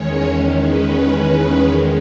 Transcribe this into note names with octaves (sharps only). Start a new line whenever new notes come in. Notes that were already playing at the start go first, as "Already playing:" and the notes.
Already playing: E2 D#3 G#3 C#4 C#5
B4